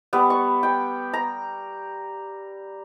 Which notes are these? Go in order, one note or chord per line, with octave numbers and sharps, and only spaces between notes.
G3 B3
C#6
G5
A#5